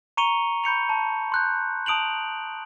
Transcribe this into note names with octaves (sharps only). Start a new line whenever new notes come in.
A#5 C#6 C#7 D#7 F7 G7
B5 G6 C#7 F7
A5
C6 F#6 G6
A5 D#6 D7 F7 F#7